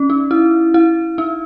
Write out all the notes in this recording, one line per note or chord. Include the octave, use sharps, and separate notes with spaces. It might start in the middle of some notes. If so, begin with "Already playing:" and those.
Already playing: C#4
D#4
E4
E4
D#4